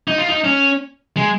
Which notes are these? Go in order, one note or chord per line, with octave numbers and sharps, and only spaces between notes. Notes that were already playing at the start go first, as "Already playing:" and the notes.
D#4
F4
D#4
C#4
G#3